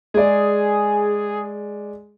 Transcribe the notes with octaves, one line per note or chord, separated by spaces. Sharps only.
G#3 G#4 D5